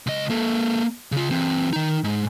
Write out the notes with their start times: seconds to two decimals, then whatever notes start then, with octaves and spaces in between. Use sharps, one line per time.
0.07 C#2 D#5
0.30 A#3 A4
1.12 C#3 F4
1.31 E3 C4
1.73 D#3 D#4
2.04 G#2